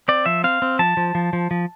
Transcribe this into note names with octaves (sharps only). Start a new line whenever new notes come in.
C4 D5
F3 E5
C4 F5
C4
F3 A5
F3
F3
F3
F3